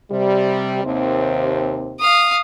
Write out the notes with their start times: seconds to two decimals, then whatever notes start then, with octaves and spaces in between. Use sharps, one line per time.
0.11 C3 G3
0.84 D#2 C3 C4
2.00 F5 D#6